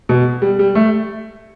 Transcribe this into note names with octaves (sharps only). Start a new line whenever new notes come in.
B2
G3
G3
A3